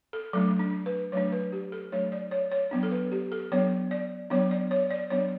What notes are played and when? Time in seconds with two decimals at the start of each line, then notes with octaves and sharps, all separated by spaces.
0.13 A4
0.33 F#3 A3 D4 A4
0.59 D4
0.86 B4
1.12 F#3 A3 D4 C#5
1.32 B4
1.52 G4
1.72 A4
1.92 F#3 A3 D4 C#5
2.12 D5
2.31 C#5
2.51 C#5
2.71 F#3 B3 D4
2.83 A4
2.91 B4
3.12 G4
3.32 A4
3.52 F#3 B3 D4 C#5
3.91 D5
4.30 F#3 B3 D4 C#5
4.51 D5
4.71 C#5
4.90 D5
5.10 F#3 B3 D4 C#5